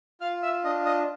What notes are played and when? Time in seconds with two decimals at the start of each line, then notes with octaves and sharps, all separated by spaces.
0.21 F4 F5 F6
0.43 E5 E6
0.64 D4 D#5 D#6
0.86 D#5 D#6